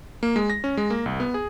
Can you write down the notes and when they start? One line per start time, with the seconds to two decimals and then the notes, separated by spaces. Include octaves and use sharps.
0.23 A#3
0.36 G#3
0.50 A#6
0.64 C#4
0.77 G#3
0.90 A#3
1.06 C2
1.20 B3
1.34 G#4